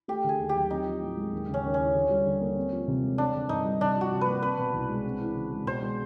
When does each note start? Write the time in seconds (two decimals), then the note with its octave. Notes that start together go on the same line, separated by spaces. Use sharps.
0.08 A3 G4
0.24 D3 G#4
0.39 D#2
0.49 G4
0.55 F#3
0.70 C4 D#4
0.86 F3
1.02 A2
1.17 G#3
1.32 D#2
1.48 C#3
1.54 C#4
1.64 D#2
1.74 C#4
1.79 E3
1.94 D3
2.10 G3
2.26 D3
2.41 A#3
2.56 C4
2.72 F3
2.88 C3
3.03 G#3
3.18 C4 D4
3.34 D3
3.49 G2 D#4
3.65 G3
3.81 C3 D4
3.96 F3 F#4
4.12 C3
4.21 B4
4.27 A#3
4.42 C4 B4
4.58 B2
4.74 C2
4.89 G#3
5.05 C4
5.20 E3
5.36 C#3
5.51 G#3
5.66 B2 C5
5.82 G#3